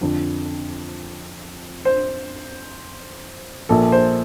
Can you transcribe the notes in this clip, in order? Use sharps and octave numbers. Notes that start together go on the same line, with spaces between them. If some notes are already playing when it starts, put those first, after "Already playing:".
F2 D3 F3
C5
A#1 A#2 F3 A4
C5